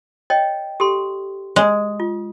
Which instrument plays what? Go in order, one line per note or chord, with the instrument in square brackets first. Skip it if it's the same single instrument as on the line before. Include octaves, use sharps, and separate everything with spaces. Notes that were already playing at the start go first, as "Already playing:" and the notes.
[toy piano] C#5 D#5 G5
G4 A4 C6
[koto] G#3
[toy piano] F4